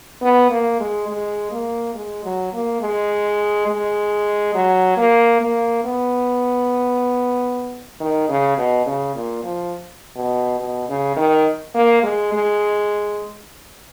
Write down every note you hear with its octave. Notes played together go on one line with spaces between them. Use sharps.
B3
A#3
G#3
G#3
A#3
G#3
F#3
A#3
G#3
G#3
F#3
A#3
A#3
B3
D#3
C#3
B2
C#3
A#2
F3
B2
B2
C#3
D#3
A#3
G#3
G#3